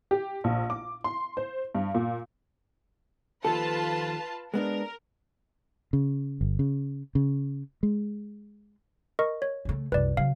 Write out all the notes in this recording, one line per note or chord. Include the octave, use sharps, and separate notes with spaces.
G4
A#1
D6
C6
C5
G2
A#2
D#2 F3 F4 A4 B4 A5
G#3 B3 D4 A#4
C#3
G1
C#3
C#3
G#3
A#4 D#5 C#6
C#5
C#3 A3
C2 F#2 B4 D5
C#3 F#3 F5